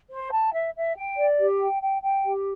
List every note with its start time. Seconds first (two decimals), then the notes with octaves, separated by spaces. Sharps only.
0.10 C5
0.31 A5
0.53 E5
0.74 E5
0.96 G5
1.16 D5
1.38 G4
1.59 G5
1.81 G5
2.03 G5
2.24 G4